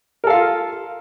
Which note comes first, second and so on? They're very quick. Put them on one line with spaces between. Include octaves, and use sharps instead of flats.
A#4 A4 F5 F4